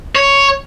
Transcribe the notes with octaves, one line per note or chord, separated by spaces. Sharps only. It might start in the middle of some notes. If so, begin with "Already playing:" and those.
C#5